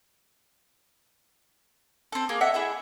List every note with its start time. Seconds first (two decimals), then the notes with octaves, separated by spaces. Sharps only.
2.12 C4 A4
2.29 A#3 G#4
2.41 A4 D#5 E5 F#5
2.54 E4 G#4 E5